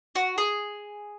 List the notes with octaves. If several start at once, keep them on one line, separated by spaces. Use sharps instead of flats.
F#4
G#4